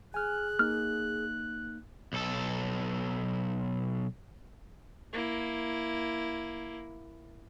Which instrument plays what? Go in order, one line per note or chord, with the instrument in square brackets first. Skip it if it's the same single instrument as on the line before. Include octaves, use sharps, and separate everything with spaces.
[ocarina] G#4 [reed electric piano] G#5 F6 [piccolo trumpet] F#6
[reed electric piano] A#3 D#4 [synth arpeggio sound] F6
[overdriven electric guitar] B1 A4
[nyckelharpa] A#3 E4